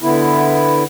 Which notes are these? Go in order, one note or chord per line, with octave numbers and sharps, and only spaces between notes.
D3 B3 E4